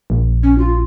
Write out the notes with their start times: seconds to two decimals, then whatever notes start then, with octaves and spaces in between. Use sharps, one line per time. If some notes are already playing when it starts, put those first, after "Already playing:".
0.10 A#1
0.43 C#4
0.58 F4